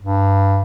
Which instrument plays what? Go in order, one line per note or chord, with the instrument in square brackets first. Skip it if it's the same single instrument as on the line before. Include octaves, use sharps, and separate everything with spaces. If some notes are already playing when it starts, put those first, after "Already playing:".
[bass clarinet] G2